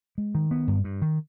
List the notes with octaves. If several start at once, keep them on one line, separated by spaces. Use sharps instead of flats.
G#3
D#3
B3
G2
G2
D#3